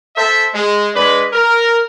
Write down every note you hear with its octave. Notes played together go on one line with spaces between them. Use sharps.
A4 C5 E5
G#3
G#3 D4 B4
A#4